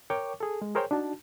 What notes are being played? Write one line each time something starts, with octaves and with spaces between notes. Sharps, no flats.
A#4 C#5 G5 C#6 D6
G#4 A4
G#3
G#4 A#4 C5 C#5 G5
D4 D#4 F#4 A5